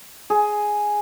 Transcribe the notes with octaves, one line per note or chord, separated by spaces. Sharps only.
G#4